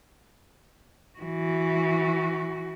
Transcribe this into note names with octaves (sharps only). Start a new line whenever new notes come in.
E3 F#4